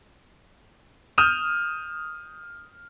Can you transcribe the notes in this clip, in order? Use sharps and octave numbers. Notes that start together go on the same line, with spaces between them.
D#6 F6 G6 D#7 E7